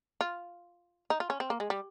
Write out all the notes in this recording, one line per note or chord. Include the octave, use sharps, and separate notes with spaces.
F4
D#4
F4
C#4
C4
A#3
G#3
G3